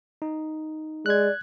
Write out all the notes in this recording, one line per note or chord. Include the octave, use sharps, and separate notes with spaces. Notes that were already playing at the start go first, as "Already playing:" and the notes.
D#4
G#3 D5 F#6 G#6